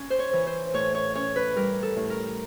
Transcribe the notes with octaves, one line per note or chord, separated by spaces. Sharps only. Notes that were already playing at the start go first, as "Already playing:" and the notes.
Already playing: C#4
C5
C#5
E3
C5
A2 C#5
C#5
C#4 C#5
B4
G3 A#4
A4
A2
A#4